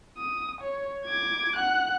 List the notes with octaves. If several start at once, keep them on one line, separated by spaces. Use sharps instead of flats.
D#6
C#5
D6 G#6
F#5 F#6